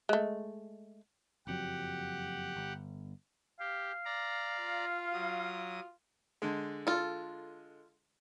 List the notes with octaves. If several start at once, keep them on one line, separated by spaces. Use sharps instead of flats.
G#3 A3
F#1 F2 F#3 G4 F#5
G1
G4 F5
D5 A#5
F4
F#3 D#6
D3 G#3
F4 A4